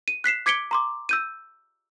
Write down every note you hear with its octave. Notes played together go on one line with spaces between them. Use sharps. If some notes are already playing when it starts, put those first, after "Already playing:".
D#7
F#6 B6 C7 E7
D6 G#6 B6 C#7 D7 G7
A#5 C6 D6
E6 G6 D#7